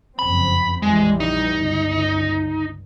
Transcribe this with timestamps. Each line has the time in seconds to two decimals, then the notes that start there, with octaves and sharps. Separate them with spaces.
0.19 F#1 F2 C4 B5
0.82 A#1 E3 G3 G#3
1.20 D#4
1.58 G1 C#2